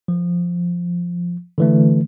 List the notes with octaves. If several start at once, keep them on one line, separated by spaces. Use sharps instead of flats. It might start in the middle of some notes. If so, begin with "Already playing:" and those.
F3
D3 E3 A3